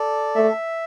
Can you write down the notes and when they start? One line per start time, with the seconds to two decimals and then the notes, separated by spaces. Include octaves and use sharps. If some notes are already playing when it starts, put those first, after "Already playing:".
Already playing: A4 D5
0.35 A3 E5